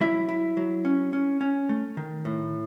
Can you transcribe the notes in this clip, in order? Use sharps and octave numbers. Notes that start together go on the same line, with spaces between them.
F#3 E4 E5
E4
F#3
C#4
C#4
C#4
A3
D#3
A2